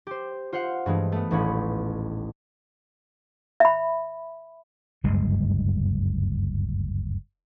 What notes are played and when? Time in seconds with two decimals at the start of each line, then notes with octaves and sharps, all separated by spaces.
0.07 G4 C5
0.53 F4 C5 F5 F#5
0.86 G2 E3 G#3 A3
1.12 A3 B3
1.31 D#1 A1 A2 C#4 B5
3.60 E5 B5
5.04 F#1 D2 G2 G#3